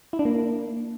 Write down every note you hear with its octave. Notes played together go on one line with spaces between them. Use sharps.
E4
D4
A#3